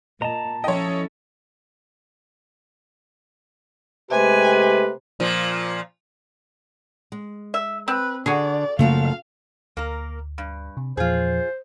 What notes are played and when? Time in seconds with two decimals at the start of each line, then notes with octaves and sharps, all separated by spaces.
0.22 A#2 D#5 A5 A#5
0.64 F3 C#4 E4 A4 C#5 D#5 G5
4.11 C3 G#3 A3 G4 B4 G#5
5.20 A#2 F3
7.12 G#3
7.54 E5
7.88 C4 B4
8.26 D3 F#4 G#4 D5
8.79 F#2 C#3 F3 A3 A#3 F5
9.77 D2 A#3 A#4
10.38 G2
10.77 C3
10.97 E2 A#2 F3 F4 G#4 C5